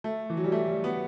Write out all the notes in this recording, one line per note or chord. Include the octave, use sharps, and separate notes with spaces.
A3
E3
F#3
G3
A3
G3
B3